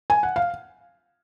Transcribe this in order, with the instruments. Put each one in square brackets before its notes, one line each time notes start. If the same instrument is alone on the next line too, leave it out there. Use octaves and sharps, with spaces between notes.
[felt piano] G#5
F#5
F5